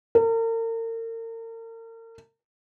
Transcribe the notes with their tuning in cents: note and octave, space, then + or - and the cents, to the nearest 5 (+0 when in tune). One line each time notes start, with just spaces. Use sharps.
A#4 -40